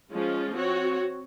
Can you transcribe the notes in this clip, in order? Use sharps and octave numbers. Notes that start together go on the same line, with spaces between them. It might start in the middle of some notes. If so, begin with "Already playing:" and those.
F3 G#3 C#4 F4
C4 F#4 C#5